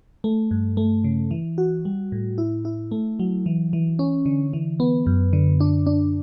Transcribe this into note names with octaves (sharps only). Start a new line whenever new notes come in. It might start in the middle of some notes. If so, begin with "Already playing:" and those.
A3
G2
A3
C#3
E3
F#4
G3
A2
E4
E4
A3
F#3
E3
E3
C#4
D3
E3
B3
F#2
D3
D4
D4